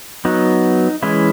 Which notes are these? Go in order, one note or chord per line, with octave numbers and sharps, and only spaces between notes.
F#3 B3 D#4
E3 G#3 C#4 E4